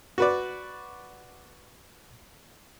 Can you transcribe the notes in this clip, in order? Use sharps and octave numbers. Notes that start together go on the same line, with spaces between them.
F#4 B4 D5